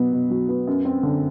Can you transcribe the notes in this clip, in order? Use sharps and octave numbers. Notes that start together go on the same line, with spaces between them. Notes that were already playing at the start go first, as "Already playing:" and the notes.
Already playing: B2 F#3 B3
B2
F#3
B3
F#2
C4
D3